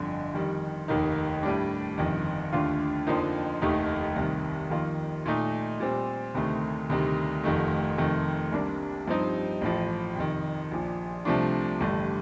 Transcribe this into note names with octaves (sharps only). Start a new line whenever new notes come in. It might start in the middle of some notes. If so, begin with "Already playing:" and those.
Already playing: G1 F2 D3
F2 D#3 G3
F1 D#2 D#3 A#3 D#4
A2 G3 D4
G1 F2 C3 D#3
D#2 D3 A3 D4 F4
F2 D3 F3 A#3 D#4
F1 D#2 D#3 A3 D#4
C2 C3 D#3
F2 D#3 A#3 F4
A#2 A3 D#4
A#2 G3 C4
D2 C3 D#3 A3
D2 C3 D#3 G3
F1 F2 D#3 A3
F2 C3 D#3 A3
C2 C3 G3 A#3 D4
G2 F3 C4 D#4
A1 A2 F3
F2 C3 D#3
A#1 A#2 F3
C2 C3 F3 A3 D4
A1 G2 D3 A3